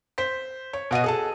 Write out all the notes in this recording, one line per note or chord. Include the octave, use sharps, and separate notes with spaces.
C5 B6
C#5
B2 F#4 D#5 D#7
G#4 A4 A5